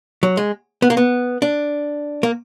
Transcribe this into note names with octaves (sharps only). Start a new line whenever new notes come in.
F#3
G#3
B3
A#3
B3
D4
A#3